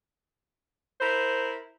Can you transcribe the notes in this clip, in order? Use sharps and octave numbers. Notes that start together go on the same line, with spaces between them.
E4 A#4 C5